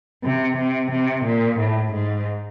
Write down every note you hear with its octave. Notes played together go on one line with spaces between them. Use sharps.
C3
C3
C3
A#2
A2
G#2